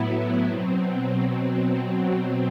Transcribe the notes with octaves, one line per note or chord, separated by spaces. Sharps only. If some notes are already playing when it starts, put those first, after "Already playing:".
Already playing: A2 F#3 B3 E4
B2 F#3 C4